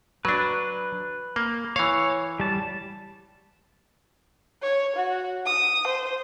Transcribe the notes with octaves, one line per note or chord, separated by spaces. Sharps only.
F#3 D4 B4
A#3
E3 C#5 F5
G3 A5
C#5
F#4
D#6
C5